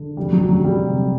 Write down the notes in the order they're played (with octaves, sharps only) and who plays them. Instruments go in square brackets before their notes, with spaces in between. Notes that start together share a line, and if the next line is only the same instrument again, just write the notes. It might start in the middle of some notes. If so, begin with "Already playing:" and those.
Already playing: [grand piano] D3
F1 G3
F#3
F1
F#3
F#3
F2 G3
C3